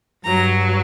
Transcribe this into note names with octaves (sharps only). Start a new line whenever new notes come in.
G2 F#3 A#5